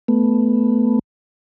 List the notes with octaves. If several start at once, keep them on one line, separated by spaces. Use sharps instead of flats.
A3 B3